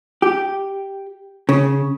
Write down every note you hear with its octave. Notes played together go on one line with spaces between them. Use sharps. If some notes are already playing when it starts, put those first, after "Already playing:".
G4
C#3